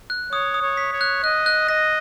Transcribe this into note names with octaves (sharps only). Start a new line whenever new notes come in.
F#6
C#5 D#6
D#6
C#5
B6
C#5
F#6
D#5 F#6
F#6
D#5 A#6